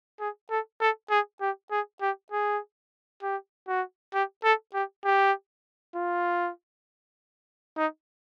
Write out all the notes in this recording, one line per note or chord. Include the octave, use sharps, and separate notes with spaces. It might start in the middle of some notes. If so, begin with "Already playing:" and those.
G#4
A4
A4
G#4
G4
G#4
G4
G#4
G4
F#4
G4
A4
G4
G4
F4
D#4